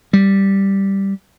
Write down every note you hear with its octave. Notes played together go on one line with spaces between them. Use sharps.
G3